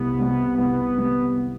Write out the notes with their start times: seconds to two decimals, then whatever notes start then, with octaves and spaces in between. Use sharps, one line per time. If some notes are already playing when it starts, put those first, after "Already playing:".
Already playing: C2 C3 B3
0.18 C3 G3
0.57 C2 B3
0.97 C3 G3